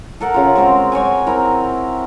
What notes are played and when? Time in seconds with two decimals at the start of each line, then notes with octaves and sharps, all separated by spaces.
0.21 A4 A#4 F#5
0.34 C#3 F4
0.55 G#3 C4 F#4 A#4
0.92 F#4 C#5 G5 G#5
1.27 C4 E4 A#4